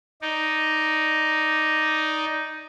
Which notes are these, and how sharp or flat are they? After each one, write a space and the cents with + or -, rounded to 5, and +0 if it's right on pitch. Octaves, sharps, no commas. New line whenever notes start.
D#4 +0 D5 +0